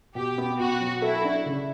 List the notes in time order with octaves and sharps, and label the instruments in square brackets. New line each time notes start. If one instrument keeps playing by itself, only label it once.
[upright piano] B2 [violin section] G4
[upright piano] B3
[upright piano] B2 [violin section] F#4
[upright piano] F#3
[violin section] E4 [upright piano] A4
[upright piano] D4
C#3